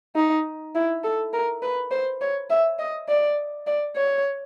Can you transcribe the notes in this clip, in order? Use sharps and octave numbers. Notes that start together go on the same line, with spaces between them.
D#4
E4
A4
A#4
B4
C5
C#5
E5
D#5
D5
D5
C#5